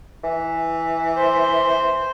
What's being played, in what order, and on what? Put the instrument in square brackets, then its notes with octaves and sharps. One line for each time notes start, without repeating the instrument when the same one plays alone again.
[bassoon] E3
[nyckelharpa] C5